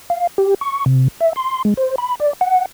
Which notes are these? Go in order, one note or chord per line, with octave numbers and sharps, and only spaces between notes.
F5
G4
C#6
C3
E5
C6
G#3
C5
B5
D5
F#5